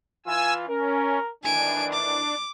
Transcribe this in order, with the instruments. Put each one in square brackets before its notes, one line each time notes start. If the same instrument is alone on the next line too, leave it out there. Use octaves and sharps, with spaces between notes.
[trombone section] E3 F4 [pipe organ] G#5 E6
[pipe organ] C#4 [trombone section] A#4
[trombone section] A2 D#3 E3 [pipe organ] D4 [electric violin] G#5 D7
[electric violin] D6